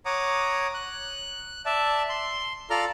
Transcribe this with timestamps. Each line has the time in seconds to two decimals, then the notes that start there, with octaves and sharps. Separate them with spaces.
0.05 C#5 F#5 A#5 D6 D#6
0.74 F#6
1.66 D5 E5 A5
2.09 C6
2.70 F4 A4 D5 A#5 F6